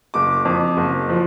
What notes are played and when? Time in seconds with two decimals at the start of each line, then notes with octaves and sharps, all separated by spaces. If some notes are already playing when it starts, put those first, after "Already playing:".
0.14 F#1 D6
0.45 F2
0.77 F#1
1.09 F3